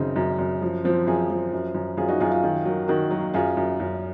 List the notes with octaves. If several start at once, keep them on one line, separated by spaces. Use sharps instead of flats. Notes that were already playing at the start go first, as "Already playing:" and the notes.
Already playing: F#2 C#3 C4 D#4
F#2
F#2
F3
F3 C4
F#2 F4 G#4
F3
F#2
F#2
F#2 F4 G#4
D#4 F#4
F#2 F4 G#4
F4 G#4
D#3
F#3
D#3 F#4 A#4
F#3
F#2 F4 G#4
F#2
F#2